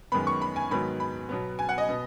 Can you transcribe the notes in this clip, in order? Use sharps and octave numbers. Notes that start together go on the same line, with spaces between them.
F#2 D#3 G#3 B3 B5
C#6
B5
G#5
G#2 D#3 F#3 B3 B5
B5
B2 F#3 B3
G#5
F#5
D#5
B2 B3